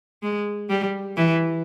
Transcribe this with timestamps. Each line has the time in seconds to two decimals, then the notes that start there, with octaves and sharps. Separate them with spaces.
0.23 G#3
0.70 G3
1.17 E3